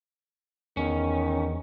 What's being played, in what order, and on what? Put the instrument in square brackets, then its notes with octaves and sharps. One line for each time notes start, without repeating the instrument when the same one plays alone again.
[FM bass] E2 [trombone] D#3 [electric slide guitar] C#4